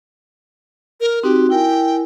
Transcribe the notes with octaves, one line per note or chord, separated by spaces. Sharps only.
A#4
C4 D#4 F#4 G4
E4 A#4 G5 G#5